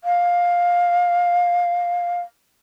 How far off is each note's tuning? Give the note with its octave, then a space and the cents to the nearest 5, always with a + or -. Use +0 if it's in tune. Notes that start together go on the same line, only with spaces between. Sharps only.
F5 +10